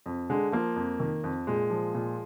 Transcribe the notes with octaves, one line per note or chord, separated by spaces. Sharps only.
F2
D3 G#3
F3 A#3
F2
D#3
F2
A#2 G#3
F3
A#2